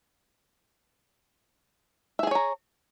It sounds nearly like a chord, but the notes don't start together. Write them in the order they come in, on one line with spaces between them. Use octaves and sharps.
E5 G#4 G#5 C#5 A#5